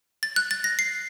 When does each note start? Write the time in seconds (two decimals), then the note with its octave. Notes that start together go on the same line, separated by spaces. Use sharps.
0.23 A6
0.36 F#6
0.51 A6
0.64 A#6
0.79 C7